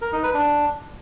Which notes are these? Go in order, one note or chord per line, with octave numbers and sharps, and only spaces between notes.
A#4
D#4
B4
D4